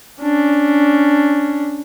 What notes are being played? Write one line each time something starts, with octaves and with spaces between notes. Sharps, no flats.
C#4 D4